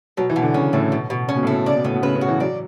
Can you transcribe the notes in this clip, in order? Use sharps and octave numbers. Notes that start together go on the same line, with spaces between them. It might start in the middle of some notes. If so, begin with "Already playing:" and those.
B2 F#3
E3
B2
D3
C#3 C#4
A2 A3
B2
B2
C#3 C#4
B2
A2
B2 A3
C#3 D5
B2
A2 B3
B2
C#3 B4
C#3
F#4
E3
F#3 D5